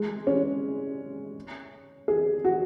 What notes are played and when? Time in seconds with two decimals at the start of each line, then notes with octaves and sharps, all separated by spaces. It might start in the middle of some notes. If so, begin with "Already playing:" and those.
Already playing: G#3
0.27 C#4
2.08 G#4
2.45 F#4